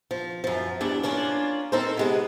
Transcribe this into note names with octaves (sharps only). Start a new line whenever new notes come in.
F3
F#2 F3
E2 G2 D4
A#3 C#4 D4 F4
C4 D#4 A4 A#4 C5
C3 G#3 B3